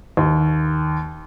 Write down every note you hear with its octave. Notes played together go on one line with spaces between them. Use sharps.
D#2